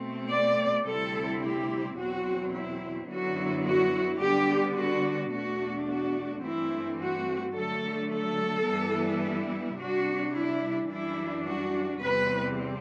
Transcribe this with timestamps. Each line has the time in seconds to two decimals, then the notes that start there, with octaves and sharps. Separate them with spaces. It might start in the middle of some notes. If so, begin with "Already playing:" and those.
Already playing: B2 A3 C4
0.31 D5
0.87 D2 C3 G3 C4 E4 A4
1.43 G4
1.97 E2 B2 F#3 C4 F#4
2.53 E4
3.09 F#2 D3 F#3 B3 E4 F#4
3.65 F#4
4.20 D3 G3 B3 D4 G4
4.77 F#4
5.32 E2 B2 A3 D4 F#4
5.88 F#4
6.43 G2 E3 A3 C4 E4
7.00 F#4
7.55 D3 F#3 A3 A4
8.11 A4
8.66 G2 E3 G3 B3 E4
9.78 C3 G3 D4 F#4
10.33 E4
10.89 F#2 E3 G3 D4 E4
11.45 F#4
12.01 E2 C3 G3 C4 B4